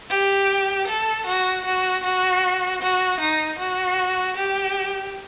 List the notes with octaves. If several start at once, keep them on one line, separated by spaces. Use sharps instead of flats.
G4
A4
F#4
F#4
F#4
F#4
D#4
F#4
G4